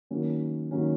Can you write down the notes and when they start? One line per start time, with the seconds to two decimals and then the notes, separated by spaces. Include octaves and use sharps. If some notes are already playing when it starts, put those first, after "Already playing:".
0.11 D#3 F#3 A#3 C#4
0.71 D#3 F#3 A#3 C#4